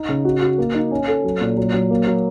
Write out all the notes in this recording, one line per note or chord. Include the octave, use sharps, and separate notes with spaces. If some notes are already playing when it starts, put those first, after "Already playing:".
Already playing: D#4
C#3
F#4
F#4
A#3
D#4
C#4
A4
F#3
A#2
F#3
F#3
A#3
F#3